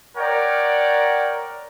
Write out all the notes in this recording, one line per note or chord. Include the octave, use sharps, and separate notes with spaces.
A#4 C#5 D5 F#5 G5